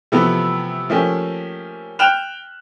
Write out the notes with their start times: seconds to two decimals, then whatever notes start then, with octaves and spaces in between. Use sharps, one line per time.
0.12 C3 E3 F3 A3 B3
0.90 F3 A3 A#3 C#4 G4
1.99 G5 F6 F#6 E7 F7